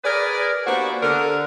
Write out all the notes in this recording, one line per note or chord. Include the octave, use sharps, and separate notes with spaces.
G#4 A#4 B4 D5
A#3 B3 D4 F#4 G4 C5
D3 A#4